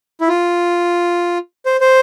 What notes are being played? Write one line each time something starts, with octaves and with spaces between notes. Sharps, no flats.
E4
F4
C5
C5